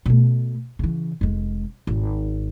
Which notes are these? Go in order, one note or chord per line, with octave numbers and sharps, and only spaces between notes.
B2 A3
C#3 E3
F1 G#3
G#1